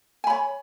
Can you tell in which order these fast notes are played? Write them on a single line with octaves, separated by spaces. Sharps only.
G#5 B5 C#5